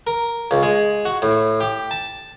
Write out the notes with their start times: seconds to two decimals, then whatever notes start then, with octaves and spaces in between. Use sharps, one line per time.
0.07 A#4
0.51 C#2
0.63 G#3
1.05 F#4
1.22 A2
1.60 G4
1.91 A5